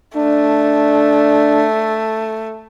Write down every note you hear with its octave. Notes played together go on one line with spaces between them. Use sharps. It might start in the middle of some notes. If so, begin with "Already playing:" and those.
A3 D4